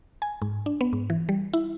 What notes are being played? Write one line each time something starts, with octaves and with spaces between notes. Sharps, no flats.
G#5
G#2
D4
B3
G#2
E3
G3
E4